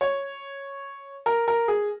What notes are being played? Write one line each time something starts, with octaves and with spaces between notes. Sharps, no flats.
C#5
A#4
A#4
G#4